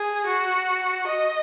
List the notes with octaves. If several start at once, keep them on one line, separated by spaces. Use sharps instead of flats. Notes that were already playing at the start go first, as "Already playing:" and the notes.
Already playing: G#4
F#4
D#5